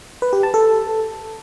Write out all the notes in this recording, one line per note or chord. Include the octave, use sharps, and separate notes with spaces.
B4
G4
A5
A4